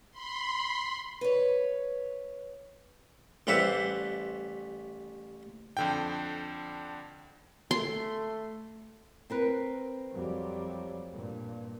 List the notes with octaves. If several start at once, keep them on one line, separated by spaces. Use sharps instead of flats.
B5 C6
B4 C#5
A1 G3 B4 C5 E5 C#6
F2 D3 G5
A3 C6
C4 A#4 B4
F2 F#3 G3
G2 A#2